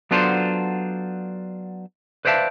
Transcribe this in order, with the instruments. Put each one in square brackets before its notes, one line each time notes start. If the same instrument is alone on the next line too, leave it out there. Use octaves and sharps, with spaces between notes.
[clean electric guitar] F#3 B3 D4 F4 A4 C5
B4 C5 D5 E5 F5 A5